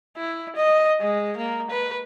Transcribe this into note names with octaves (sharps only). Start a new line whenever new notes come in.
E4
D#5
G#3
A#3
B4